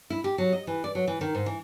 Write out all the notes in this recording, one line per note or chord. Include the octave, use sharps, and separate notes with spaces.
E4
G4
F#3
D#5
E3
D5
F#3
E3
D#3
G#2
E3